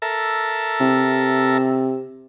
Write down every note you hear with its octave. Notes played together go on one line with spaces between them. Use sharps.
A4 A#4 E5
C3